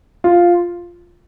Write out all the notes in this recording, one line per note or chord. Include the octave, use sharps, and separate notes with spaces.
F4